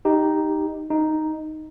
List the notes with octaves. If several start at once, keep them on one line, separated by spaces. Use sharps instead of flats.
D#4 G4
D#4